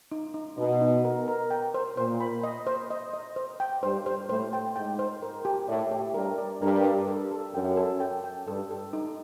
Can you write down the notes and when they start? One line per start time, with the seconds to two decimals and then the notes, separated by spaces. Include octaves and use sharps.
0.12 D#4
0.34 D#4
0.58 B2 D#4
0.81 D#4
1.05 A#4
1.28 A#4
1.50 G5
1.74 C5
1.97 A#2 C5
2.20 B5
2.43 D#5
2.67 C5
2.91 D#5
3.13 D#5
3.36 C5
3.60 G5
3.83 G2 C5
4.06 C5
4.29 A2 C5
4.53 G5
4.76 G#2 G5
4.99 C5
5.22 A#4
5.45 G4
5.68 A2 D5
5.91 G4
6.14 G2 A#4
6.38 D5
6.61 G2 A#4
6.85 D5
7.08 A4
7.31 A4
7.54 F#2 G5
7.77 A4
8.00 G5
8.24 G5
8.47 G2 A4
8.70 A4
8.93 D#4